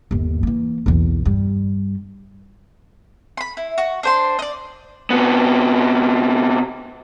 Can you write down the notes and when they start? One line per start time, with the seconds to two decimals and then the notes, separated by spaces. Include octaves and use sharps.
0.11 G1 D#2
0.43 E3 A#3
0.86 B1 E2
1.25 G2 G3
3.37 B5 C6
3.57 E4
3.78 F#4
4.03 D4 C5 C6
4.39 D5 D#5
5.10 C3 B3